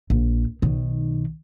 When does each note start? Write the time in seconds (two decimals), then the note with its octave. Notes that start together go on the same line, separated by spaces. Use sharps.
0.10 A#1
0.62 B1 D#3